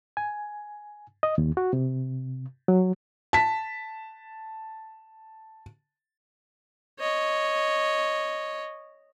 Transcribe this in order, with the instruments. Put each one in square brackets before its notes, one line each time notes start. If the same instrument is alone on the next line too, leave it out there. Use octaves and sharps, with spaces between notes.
[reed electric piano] G#5
D#5
D#2
F#4
C3
F#3
[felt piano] A5 B6
[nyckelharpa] C#5 D#5